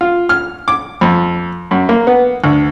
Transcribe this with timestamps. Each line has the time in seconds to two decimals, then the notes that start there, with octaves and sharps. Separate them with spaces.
0.01 F4
0.29 F6
0.68 D6
1.01 F2
1.71 F#2
1.89 A#3
2.07 B3
2.44 D2